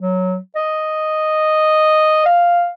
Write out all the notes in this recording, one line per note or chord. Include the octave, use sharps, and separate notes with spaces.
F#3
D#5
F5